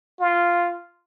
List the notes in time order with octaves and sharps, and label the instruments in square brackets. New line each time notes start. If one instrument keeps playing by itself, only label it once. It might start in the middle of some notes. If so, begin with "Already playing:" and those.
[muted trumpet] F4